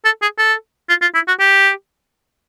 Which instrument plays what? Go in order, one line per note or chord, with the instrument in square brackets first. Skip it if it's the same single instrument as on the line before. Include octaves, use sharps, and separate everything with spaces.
[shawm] A4
G#4
A4
F4
F4
E4
F#4
G4